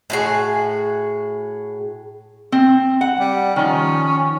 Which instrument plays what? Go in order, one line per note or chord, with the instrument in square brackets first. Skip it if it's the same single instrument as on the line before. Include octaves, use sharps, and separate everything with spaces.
[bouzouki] A2 F#4 G#4
[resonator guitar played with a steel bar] C4
F#5
[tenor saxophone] G3
[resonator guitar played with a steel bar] D#3 F3 [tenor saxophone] C#4